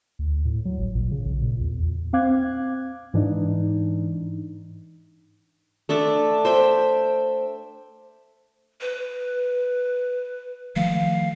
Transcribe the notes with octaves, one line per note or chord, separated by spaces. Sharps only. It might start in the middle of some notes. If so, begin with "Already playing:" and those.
D2
A2
F#3
A1
A#2
C#3
A#1
A#2
E2
C4 F5 D6 F#6 G#6
G#2 E3 D4 D#4
A3 D4 D5 E5
C5 E5 G5
B4
D#3 F3 A3 F5